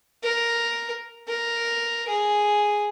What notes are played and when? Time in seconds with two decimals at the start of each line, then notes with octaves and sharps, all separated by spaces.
0.23 A#4
1.28 A#4
2.08 G#4